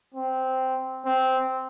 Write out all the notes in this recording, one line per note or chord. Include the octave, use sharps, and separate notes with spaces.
C4
C4